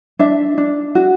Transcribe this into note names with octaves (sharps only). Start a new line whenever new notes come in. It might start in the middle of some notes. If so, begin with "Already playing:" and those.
D4 E5
D4
F#4